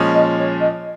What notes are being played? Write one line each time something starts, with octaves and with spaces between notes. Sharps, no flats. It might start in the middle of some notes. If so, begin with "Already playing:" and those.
Already playing: A#2 F3 G#3 C#4
D#5
C#5
D#5